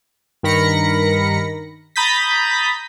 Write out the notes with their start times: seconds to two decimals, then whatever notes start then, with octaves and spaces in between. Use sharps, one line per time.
0.43 G2 D#3 A#4 B5 A#6 C#7
1.96 A#5 B5 D#6 G6 A6 B6